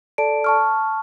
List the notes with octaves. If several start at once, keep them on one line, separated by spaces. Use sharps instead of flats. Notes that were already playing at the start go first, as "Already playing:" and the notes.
A4 D5 A5 D7
A5 C#6 F6